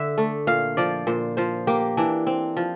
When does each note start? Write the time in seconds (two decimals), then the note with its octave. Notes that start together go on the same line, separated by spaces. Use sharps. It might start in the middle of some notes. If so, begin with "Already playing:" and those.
Already playing: D3 E5
0.18 A3
0.47 A#2 F5
0.77 F3 D5
1.07 A#2 C5
1.37 F3 C5
1.67 A#3 G4
1.97 E3 D4
2.27 C4
2.57 F3